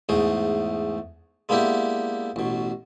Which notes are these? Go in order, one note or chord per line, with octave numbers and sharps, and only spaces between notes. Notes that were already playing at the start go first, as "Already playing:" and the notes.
E2 G#2 A3 G#4
G#3 A#3 B3 D4 E4 G4
A1 B2